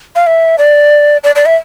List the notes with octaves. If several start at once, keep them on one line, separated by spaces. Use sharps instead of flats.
F5
E5
D5
D5
D5
E5